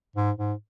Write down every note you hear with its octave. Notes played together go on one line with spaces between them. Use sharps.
G#2
G#2